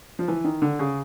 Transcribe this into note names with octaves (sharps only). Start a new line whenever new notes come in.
F3
E3
D#3
D3
C#3